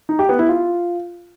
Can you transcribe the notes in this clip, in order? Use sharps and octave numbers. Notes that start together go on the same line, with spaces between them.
D#4
G4
B3
E4
F4